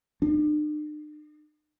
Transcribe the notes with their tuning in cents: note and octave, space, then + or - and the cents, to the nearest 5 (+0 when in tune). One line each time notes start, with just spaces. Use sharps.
D4 +45